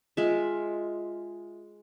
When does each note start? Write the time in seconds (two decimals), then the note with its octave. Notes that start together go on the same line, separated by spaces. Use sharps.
0.17 G#3 F4 E5